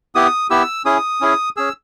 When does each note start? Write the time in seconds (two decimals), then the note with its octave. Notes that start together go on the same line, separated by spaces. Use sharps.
0.15 B3 E4 G4 D#6
0.50 B3 E4 G4 E6
0.85 C#4 E4 G#4 D#6
1.21 C#4 E4 G#4
1.57 C#4 G#4 E6